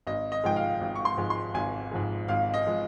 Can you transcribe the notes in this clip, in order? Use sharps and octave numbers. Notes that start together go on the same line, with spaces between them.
G#1 D#5
D#5
G#2 F3 G#3 G5
F5
G#1
C#6
C6
G#2 F3 G#3
C6
G#1 G#5
G#2 F3 G#3
G#1 F5
D#5
F3 G#3